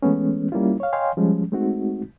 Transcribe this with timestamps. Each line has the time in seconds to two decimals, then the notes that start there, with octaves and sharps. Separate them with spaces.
0.03 E3 G#3 A3 B3 C#4
0.52 G3 A#3 C#4 E4 F4
0.80 C#5 F5
0.93 C#5 D#5 F5 G5 G#5 C6
1.17 F3 G3 G#3 C#4
1.52 G#3 A3 C4 D#4 F#4